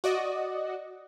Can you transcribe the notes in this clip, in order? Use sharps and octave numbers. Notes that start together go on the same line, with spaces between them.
F#4 D5 D#5